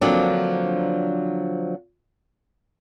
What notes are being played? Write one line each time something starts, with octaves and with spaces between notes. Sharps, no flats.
D3 F3 F#3 A#3 C4 D4